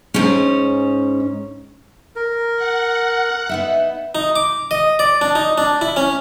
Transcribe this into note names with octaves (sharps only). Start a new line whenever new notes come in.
G#2 C#4
A#4
F#5
B3 D#4 E5
D#4
D6
D#5
D5
D4
D#4
D4
E4
C#4